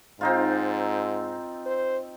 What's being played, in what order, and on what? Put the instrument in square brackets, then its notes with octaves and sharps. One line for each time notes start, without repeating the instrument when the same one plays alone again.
[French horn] G#2 [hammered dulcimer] C4 D#4 F4
[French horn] C5